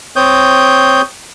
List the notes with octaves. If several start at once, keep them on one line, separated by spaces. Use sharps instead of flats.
C4 C#5 D#6 G6